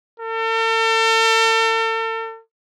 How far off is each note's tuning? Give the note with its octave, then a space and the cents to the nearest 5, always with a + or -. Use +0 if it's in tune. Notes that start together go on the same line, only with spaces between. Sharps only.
A4 +40